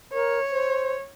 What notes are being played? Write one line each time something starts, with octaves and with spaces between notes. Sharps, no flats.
A#4 C#5
C5